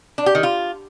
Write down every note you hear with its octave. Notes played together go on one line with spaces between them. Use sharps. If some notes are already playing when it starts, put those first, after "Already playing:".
D4
G4
D#3
F4